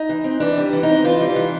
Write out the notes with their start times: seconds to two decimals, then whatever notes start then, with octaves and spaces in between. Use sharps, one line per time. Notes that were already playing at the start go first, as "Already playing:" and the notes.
Already playing: D#4
0.09 E3
0.24 C4
0.40 E3 D4
0.57 G3
0.73 E3
0.83 D#4
0.89 C4
1.04 E3 F4
1.21 G3
1.36 E3